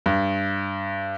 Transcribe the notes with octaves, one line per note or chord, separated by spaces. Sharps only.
G2